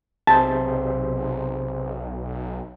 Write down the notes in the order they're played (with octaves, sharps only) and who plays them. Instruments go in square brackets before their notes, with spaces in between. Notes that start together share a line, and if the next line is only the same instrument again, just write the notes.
[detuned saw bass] B1 [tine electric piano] C3 G#4 C5 [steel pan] A5